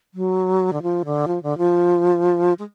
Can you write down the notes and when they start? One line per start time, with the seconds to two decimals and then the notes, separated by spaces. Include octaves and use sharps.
0.14 F#3
0.73 D3
0.83 F3
1.05 D3
1.28 F3
1.43 D3
1.58 F3
2.59 G#3